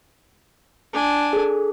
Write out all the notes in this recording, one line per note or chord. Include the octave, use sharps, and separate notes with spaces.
D4 G#5
G#4 A4